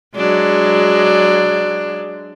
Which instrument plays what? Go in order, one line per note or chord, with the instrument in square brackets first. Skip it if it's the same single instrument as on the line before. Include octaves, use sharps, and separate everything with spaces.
[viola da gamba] F#3 G#3 D4